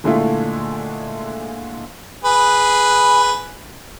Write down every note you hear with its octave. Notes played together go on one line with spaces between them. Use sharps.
A#2 D3 G#3 A3 E4 F4
G#4 B4